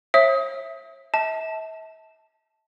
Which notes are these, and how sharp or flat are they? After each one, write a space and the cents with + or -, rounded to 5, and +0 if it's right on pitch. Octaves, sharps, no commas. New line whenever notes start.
C#5 -40 E5 +0 D#6 +25
E5 -40 A5 +0